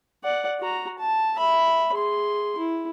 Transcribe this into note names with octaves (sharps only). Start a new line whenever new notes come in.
D5 F#5
F#4 A#5
A5
E5 B5
G#4 C6
E4